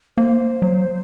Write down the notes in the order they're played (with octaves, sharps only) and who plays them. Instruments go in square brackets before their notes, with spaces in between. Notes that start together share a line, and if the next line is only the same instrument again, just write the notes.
[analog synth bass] A#3 [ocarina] C5
[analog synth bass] F#3